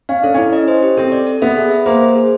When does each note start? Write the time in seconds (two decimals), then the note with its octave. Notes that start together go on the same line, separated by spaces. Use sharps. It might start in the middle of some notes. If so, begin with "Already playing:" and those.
0.09 C#4 F5
0.22 D4 A4
0.34 C#4 E4
0.53 D#5
0.68 C5
0.83 G4
0.97 C4 A4
1.12 D5
1.27 A4
1.42 B3 E5
1.57 G#4
1.71 E5
1.86 A#3 C5
2.00 C5
2.16 G#4